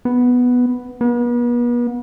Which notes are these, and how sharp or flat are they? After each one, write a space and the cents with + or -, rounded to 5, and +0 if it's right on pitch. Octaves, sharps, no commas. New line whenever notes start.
B3 +0
B3 -40